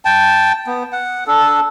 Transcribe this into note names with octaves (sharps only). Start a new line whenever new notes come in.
G5 A5
B3
F#5
D4 A4